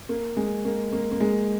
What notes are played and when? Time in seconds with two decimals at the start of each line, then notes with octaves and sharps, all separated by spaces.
0.09 A#3
0.37 G#3
0.65 A#3
0.93 A#3
1.12 A#3
1.20 G#3